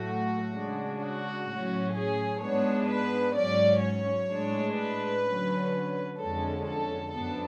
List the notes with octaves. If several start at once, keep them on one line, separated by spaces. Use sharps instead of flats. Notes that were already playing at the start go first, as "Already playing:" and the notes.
Already playing: A2 F#3 A3 F#4
C#3 G#3 D4
F#4
A2 F#3 C#4
G#4
G#2 G#3 B3 D4 C#5
B4
G#2 F#3 C#4 D5
C#5
A2 G#3 D4
B4
D3 F#3 C#4
F2 D3 G#3 C#4 A4
A4
F#2 F3 B3 D4 A4